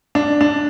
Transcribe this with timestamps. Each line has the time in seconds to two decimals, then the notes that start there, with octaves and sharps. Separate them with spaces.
0.15 D4
0.41 D4